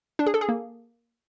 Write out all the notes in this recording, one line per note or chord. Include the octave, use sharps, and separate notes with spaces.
D4
G#4
A4
G#4
A#3